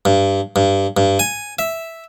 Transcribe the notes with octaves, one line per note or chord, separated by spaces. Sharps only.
G2
G2
G2
G#5
E5